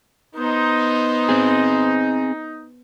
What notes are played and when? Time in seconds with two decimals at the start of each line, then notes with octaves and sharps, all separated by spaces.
0.35 B3 D#4 C5
1.29 C4 G#4